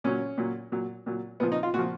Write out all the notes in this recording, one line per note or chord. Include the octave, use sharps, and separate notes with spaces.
A#2 F#3 C#4
A#2 F#3
A#2 F#3
A#2 F#3
A#2 F3 B3
D#4
F4
A#2 F3 F#4